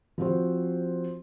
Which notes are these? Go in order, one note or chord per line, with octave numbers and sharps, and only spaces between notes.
F3 C4 F#4 C5